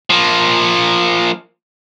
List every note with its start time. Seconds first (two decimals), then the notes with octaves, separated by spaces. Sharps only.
0.10 F3 A#3